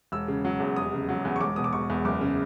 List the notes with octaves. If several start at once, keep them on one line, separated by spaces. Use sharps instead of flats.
E1 E6
C#3
F#3
E2
F1 D#6
C#3
F#3
E2
C#6
E1 D6
B2 D#6
D6
E1 C#6
E2
F#1 D6
C#3